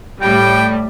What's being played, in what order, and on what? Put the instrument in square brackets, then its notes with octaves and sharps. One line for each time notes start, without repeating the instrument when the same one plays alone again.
[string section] A2 G3 [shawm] G5